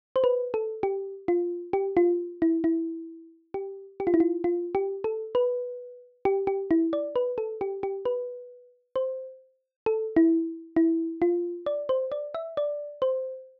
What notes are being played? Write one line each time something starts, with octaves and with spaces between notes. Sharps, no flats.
C5
B4
A4
G4
F4
G4
F4
E4
E4
G4
G4
F4
E4
F4
F4
G4
A4
B4
G4
G4
E4
D5
B4
A4
G4
G4
B4
C5
A4
E4
E4
F4
D5
C5
D5
E5
D5
C5